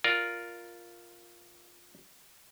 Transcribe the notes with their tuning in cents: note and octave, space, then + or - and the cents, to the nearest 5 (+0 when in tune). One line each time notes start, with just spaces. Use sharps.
F4 +0 A#4 +0 D5 +15